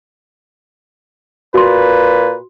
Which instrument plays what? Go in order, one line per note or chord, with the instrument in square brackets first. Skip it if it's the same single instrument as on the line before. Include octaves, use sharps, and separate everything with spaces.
[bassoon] A#2 [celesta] F#4 C6 [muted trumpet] B4